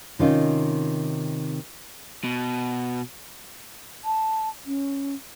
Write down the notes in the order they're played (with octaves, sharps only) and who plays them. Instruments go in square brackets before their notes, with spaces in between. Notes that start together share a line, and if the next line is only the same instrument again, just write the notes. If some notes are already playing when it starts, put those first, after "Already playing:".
[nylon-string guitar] C3 D#3 C4 C#4 D#4 F4
[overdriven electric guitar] B2
[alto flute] A5
C#4